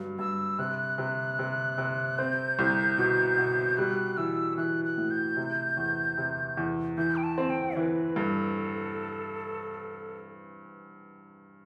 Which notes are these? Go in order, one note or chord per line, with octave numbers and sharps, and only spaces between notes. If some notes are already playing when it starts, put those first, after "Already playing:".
Already playing: G2 F#3
G2 E6
C3 F#6
C3
C3
C3
C4 G6
C2
B2
B2
G3 F#6
E3 E6
E3 F#6
F#6
A2
G6
C3
E2
C3
E2
E3 G6
G5
A5
C4
G5
E3 B4
G2 A4